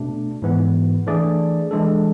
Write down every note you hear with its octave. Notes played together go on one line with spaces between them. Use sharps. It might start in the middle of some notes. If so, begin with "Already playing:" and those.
Already playing: B2 A3 D4
G#2 E3 B3
E3 A3 D4 G#4 D5
E3 G#3 D4 A4